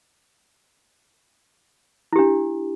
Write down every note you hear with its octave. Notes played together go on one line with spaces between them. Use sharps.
D4 E4 G4